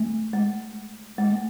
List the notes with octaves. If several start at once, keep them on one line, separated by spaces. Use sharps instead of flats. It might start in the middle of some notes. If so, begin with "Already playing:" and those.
Already playing: A3
G#3
G#3
A3